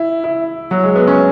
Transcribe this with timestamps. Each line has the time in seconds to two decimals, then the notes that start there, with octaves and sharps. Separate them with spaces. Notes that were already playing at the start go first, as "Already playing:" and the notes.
Already playing: E4
0.24 E4
0.71 F#3
0.83 G#3
0.96 B3
1.07 C#4